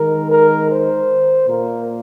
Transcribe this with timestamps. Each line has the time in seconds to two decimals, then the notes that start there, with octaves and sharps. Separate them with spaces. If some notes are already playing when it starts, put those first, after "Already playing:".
Already playing: D#3 G#3 A#4
0.30 A#4
0.69 C5
1.47 A#2 A#3 A#4